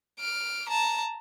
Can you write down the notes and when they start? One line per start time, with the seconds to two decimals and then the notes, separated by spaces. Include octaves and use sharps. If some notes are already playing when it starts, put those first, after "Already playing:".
0.19 F6 D7
0.69 A5 A#5